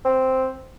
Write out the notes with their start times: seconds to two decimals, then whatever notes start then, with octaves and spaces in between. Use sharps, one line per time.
0.05 C4